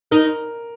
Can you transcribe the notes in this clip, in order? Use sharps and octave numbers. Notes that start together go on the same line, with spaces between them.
D#4 A#4